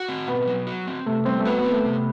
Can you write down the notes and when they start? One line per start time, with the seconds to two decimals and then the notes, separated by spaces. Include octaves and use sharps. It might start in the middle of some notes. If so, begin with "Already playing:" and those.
Already playing: F#4
0.09 C4
0.28 B2 B3
0.47 F#3
0.67 F#4
0.87 C4
1.06 C3 A3
1.25 G3 C4
1.39 A3
1.45 B3 F#4
1.59 B3
1.64 C4
1.71 A3
1.85 C3